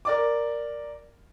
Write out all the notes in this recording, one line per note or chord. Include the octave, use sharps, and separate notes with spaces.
A#4 D5 D6